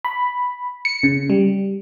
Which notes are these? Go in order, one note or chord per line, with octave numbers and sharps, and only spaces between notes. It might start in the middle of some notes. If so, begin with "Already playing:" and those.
B5
C#7
C#3
G3